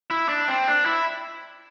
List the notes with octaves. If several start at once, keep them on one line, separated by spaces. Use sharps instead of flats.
E4
D4
C4
D4
E4